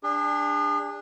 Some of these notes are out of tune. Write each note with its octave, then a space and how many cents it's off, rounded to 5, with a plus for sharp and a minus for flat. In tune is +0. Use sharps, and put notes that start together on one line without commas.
D4 +0 G#4 -40